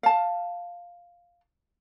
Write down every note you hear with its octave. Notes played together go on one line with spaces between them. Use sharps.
F5 A5